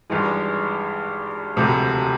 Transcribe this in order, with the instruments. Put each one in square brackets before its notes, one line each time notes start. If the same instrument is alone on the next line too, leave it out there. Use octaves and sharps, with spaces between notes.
[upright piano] G#1 G2 E3 G#3
E1 D2 C3 F3